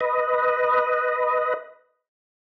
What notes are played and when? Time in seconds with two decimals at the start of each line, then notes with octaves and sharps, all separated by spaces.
0.01 B4 D#5